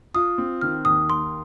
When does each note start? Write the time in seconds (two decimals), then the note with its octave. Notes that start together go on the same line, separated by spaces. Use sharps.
0.14 F4 D#6
0.38 C4
0.61 D#3 F6
0.85 D#2 D#6
1.08 A#3 C6